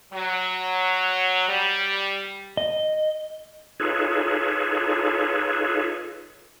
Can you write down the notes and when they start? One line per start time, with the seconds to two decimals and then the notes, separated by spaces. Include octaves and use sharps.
0.13 F#3
1.48 G3
2.57 D#5
3.80 D#4 F4 G#4 A4 B4 C#5